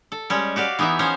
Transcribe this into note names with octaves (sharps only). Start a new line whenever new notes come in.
A4
G3 G#3 C#4
F#4 G4 D5 F5
E3 B3 D#4 E4 E5
F3 B3 C#4 C5 C#5